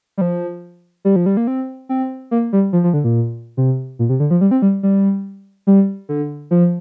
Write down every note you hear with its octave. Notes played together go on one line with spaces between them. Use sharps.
G3
F3
G3
F3
G3
A#3
C4
C4
A#3
G3
F3
F3
D3
A#2
C3
A#2
C3
D3
F3
G3
C4
G3
G3
G3
D3
F3